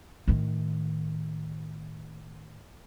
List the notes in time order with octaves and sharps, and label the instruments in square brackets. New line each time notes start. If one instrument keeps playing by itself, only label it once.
[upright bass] A2 D#3